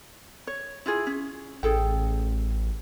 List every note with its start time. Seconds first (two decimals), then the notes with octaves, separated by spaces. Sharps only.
0.47 C#5
0.86 E4 F4 G#4
1.07 C#4
1.63 A1 G#4 A4 G5